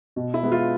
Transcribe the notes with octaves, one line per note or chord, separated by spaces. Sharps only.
B2
E4
G#3 B3
F4